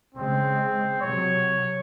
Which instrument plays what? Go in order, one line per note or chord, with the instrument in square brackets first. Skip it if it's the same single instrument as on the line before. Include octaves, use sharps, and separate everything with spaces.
[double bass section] C#3 G#3 [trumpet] C4
[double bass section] C3 F#3 [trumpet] C#5